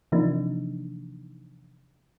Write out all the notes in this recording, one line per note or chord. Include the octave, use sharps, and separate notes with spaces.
C3 E3 F3 A#3 D4 D#4